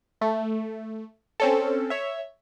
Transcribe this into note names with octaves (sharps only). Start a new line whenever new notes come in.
A3
C4 C#4 A4
C#5 E5